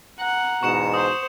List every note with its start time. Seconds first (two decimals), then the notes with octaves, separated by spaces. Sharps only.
0.20 F#5 A#5
0.63 E2 G#2 B2 C#6 C#7 E7
0.94 C5 D#6